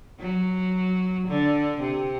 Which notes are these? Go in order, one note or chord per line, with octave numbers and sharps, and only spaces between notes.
F#3
D3
C3